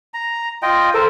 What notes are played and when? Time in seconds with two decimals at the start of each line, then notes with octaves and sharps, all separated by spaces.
0.14 A#5
0.62 F4 D#5 G5
0.94 A4 A#4 C5